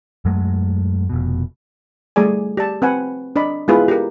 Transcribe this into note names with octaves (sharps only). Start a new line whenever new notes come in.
F#2 F#3 G#3 A3
F1 B2
G3 A3 G#4 D5 G#5
G4 D5 A5
C4 B4 F#5 G#5
D4 D5 D#5 B5
G#3 B3 E4 F4 G#4 B4
G4 A#4